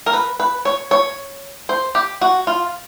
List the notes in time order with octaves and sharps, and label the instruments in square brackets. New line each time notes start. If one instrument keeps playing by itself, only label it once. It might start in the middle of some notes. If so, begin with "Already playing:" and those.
[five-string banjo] A#4
B4
B4
C#5
C#5
C5
G4
F#4
F4